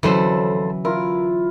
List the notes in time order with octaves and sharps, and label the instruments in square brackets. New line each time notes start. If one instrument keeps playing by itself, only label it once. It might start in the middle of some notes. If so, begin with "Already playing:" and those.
[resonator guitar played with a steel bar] F2 A4 C5 [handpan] D3 F#3 C#4 [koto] E3
[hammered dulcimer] E4 F4 [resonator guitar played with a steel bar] A#4